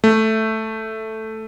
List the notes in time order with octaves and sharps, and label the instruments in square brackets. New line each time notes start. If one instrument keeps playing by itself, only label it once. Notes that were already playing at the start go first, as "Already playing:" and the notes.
[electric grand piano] A3